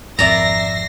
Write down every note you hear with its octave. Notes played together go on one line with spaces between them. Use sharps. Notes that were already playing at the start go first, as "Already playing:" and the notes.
G#1 F2 C4 D5 E5 A#5 A#6 C7